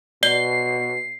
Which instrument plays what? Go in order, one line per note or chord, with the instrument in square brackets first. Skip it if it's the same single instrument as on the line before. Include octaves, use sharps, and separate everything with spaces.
[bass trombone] B2 [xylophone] D5 G7 [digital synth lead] C7